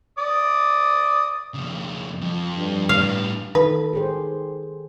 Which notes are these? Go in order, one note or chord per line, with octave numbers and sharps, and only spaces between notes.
D5 D6 D#6
F2 C#3
F2
G2
A2 G3 F5
D#3 A4 B4
G4 G#4 C5